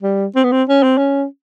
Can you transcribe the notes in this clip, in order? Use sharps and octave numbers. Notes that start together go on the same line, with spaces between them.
G3
C4
B3
C4
C#4
C4
C#4